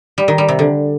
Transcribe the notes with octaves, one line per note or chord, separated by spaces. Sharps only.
G3
D#3
G3
C3
D3